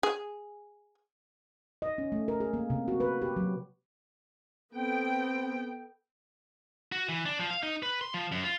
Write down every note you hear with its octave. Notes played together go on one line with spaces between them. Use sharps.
G#4
D#5
C#4
A3
A#4
G#4
A#3
C3
F#4
B4
G4
F#3
B3 C4 A4 G5
F#4
E3
D4
F3
F5
D#4
B4
C6
F3
F#2
F4